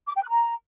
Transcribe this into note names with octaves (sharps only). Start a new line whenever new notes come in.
D6
G5
F#6
A#5